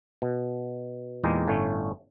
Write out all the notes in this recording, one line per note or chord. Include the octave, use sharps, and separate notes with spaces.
B2
E2 A#2 G#3 D#4 G4 A#4
G1 A2 A3 C#4